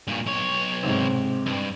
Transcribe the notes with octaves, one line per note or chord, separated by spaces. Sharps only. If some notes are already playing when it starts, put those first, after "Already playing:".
G2 A#2
B1 C#5
G#2 C3 C4
G2